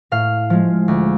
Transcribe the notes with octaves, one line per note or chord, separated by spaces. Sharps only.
A2 F5
F3 G#3
D2